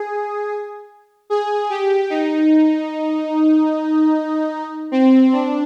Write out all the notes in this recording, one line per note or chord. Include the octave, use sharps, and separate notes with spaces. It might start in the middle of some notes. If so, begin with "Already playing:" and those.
Already playing: G#4
G#4
G4
D#4
C4
D4